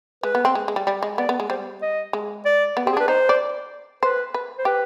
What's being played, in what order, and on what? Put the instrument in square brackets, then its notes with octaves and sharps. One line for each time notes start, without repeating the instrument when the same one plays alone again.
[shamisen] G#3 [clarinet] B4
[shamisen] B3
C4
G#3
G#3
G3
[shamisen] G3 [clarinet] D5
[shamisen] G#3 [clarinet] D#5
[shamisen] B3 [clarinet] D5
[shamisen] B3
G#3
[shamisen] G3 [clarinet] C5
[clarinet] D#5
[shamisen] G#3
[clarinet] D5
[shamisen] B3
[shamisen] C4 [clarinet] G4
[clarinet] G#4
[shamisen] D4 [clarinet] B4
[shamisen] D#4 [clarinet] C5
[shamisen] D5
[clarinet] B4 [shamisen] C5
[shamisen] B4
[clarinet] C5
[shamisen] G4 [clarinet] B4